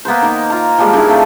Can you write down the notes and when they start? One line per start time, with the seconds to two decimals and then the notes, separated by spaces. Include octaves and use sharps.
0.05 A#3 B3 B4 C5
0.22 D#3 A#3
0.50 F4 A#5
0.78 F3 G3 G#3 A#3
0.93 D#3 G#3 D4 E4
1.08 F3 A3 C4 F4